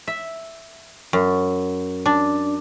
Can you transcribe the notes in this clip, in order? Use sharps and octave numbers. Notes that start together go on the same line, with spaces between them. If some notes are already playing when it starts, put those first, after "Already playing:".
E5
F#2
D4